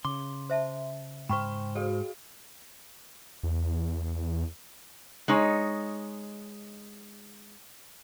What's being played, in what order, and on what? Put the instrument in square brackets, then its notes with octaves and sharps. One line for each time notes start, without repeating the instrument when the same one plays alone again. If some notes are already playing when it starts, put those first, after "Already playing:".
[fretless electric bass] C#3 [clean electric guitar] C6 [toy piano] D6
[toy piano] C5 E5 A5
[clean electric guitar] G#2 C5 [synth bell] G5 F6 [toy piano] B5 C#6
[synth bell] F#4 G#4 F5 [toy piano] A4
[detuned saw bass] E2
[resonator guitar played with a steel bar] G#3 D#4 C#5